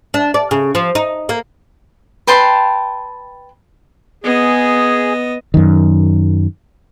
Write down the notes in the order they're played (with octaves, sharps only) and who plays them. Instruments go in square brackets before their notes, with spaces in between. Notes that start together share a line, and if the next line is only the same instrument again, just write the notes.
[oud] D4
D5
C#3
F3
D#4
A#3
[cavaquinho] B4 G5 A5 C6
[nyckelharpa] B3 D#5 [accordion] G#4
[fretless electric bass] F#2 D#3